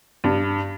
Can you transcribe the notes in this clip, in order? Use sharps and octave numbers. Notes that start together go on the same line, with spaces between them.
G2